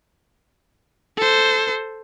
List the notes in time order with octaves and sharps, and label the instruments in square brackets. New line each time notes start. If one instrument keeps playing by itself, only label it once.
[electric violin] A4 C5